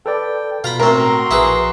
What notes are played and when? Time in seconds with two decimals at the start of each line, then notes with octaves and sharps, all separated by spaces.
0.06 A4 B4 D5 G5
0.64 B2 F4 A#5 B5
0.80 A2 C4 F#4 A#4 C6
1.31 A#1 E4 G#4 B4